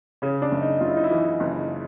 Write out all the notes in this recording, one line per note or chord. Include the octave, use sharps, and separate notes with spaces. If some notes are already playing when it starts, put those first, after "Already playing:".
C#3 C#4
D4
F#1
D#4
F#1 F4
E4
D#4
E4
E3
F#1